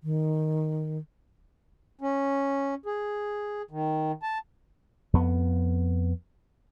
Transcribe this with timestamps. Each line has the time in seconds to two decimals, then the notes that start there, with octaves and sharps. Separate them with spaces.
0.03 D#3
2.01 C#4
2.86 G#4
3.71 D#3
4.23 A5
5.13 F2 B3